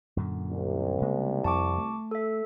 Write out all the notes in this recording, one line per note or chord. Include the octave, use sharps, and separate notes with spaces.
F#2 A#2 D3
C2
C#3 G#3 A#3
F2 A5 C#6 D6
A3
A4 E5